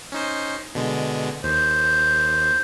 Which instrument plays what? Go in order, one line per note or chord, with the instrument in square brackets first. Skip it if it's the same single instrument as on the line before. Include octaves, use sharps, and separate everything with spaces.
[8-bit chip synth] C#4 D#4 C5
B2 D3 G#3
[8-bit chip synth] D#2 [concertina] C5